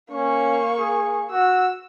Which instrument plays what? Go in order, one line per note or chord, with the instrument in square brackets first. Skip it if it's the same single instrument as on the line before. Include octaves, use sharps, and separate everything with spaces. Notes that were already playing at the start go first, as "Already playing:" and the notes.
[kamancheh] A#3 C#6 [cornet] C#4
[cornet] G#4
[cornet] F#4 [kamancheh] E6